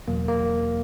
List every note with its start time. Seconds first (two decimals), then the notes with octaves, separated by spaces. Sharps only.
0.08 E2 B2 F#3 A#3
0.28 A#3